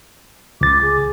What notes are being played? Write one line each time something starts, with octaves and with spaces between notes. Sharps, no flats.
C#2 D6 A6
G#4